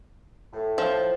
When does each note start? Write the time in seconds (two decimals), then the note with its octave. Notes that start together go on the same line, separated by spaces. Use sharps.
0.53 A2
0.78 F3